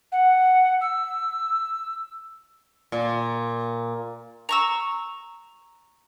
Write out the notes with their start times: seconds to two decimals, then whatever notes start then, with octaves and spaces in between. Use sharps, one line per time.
0.12 F#5
0.81 E6
2.92 A#2
4.49 A#5 C#6 E6